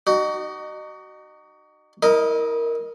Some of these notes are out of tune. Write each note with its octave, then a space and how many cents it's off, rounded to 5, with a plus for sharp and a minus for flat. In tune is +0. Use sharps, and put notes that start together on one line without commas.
D#4 -30 F#4 +30
E4 -35 A#4 +0 D#5 +0